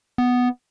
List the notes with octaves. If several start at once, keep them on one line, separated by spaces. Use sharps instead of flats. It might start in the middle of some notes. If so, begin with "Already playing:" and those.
B3